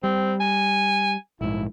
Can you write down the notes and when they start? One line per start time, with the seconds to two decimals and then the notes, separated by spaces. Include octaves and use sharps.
0.03 G3 C4
0.40 G#5
1.41 A#1 G#2 E4